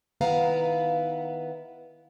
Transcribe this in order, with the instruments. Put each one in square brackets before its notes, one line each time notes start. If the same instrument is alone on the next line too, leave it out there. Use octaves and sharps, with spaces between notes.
[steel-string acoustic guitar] D#3 B3 E4 F5 A#5